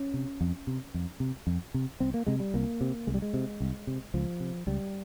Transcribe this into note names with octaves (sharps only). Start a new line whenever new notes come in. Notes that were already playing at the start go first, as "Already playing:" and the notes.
Already playing: C#4
C3
F2
C3
F2
C3
F2
C3
C2 C4
A#3
C3 G#3
G3
C2 A#3
C3
C2 G#3
G3
G#3
C3
C2
C3
C#2 F3
C3
C#2 G3